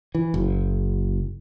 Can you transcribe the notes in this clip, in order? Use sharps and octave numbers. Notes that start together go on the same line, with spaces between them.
E3
F#1